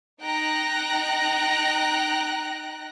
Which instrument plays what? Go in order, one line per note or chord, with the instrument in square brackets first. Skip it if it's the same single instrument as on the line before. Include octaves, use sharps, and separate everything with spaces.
[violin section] D#4 G5 A#5 F#6 A#6